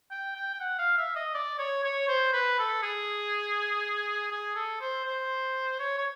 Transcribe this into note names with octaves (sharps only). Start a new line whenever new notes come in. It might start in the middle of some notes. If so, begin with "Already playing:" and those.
G5
G5
G5
F#5
F5
E5
D#5
D5
C#5
C#5
C5
B4
A4
G#4
G#4
A4
C5
C5
C#5
C#5